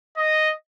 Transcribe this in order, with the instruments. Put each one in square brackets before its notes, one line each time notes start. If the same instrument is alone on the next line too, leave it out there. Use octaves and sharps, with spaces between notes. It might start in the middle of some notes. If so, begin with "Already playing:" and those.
[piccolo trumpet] D#5